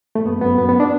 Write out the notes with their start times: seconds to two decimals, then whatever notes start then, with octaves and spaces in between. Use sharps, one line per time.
0.15 A3
0.25 F#2 B3
0.41 F#2 B3
0.58 F#2 B3
0.69 B3
0.80 D4